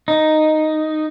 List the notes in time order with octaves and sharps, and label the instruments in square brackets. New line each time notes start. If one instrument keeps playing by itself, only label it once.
[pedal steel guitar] D#4